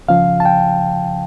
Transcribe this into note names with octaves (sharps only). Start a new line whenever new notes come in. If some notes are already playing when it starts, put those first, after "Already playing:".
C#2 C#3 F3 F5
A5
G5